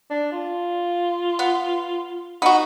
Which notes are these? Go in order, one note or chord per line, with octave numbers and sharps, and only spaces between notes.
D4
F4
B3
B3 D#4 F#4